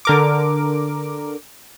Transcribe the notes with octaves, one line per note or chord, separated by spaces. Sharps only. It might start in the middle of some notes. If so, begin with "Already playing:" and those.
D3 A#4 D6